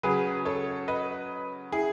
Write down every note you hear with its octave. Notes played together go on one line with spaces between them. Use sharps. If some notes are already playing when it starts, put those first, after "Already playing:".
C#3 F#3 G#4 B4
A4 C#5
B4 D#5
E4 G#4